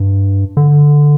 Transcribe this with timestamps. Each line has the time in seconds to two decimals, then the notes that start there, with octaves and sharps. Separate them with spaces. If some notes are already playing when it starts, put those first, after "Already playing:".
Already playing: G2
0.57 D3